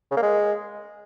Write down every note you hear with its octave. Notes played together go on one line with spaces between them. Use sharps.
C#3
A#3
G#3